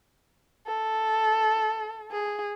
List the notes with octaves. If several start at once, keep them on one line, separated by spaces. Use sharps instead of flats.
A4
G#4